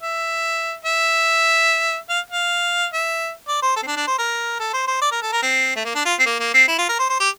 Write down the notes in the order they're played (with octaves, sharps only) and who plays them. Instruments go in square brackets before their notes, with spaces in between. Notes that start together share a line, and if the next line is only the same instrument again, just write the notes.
[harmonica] E5
E5
F5
F5
E5
D5
C5
A4
C4
D4
D4
C5
A#4
A4
C5
C5
D5
A#4
A4
A#4
C4
A3
A#3
D4
F4
C4
A#3
A#3
C4
E4
F4
A#4
C5
C5
G4